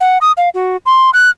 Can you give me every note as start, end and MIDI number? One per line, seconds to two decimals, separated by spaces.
0.01 0.18 78
0.21 0.32 87
0.37 0.49 77
0.54 0.77 66
0.86 1.10 84
1.14 1.30 90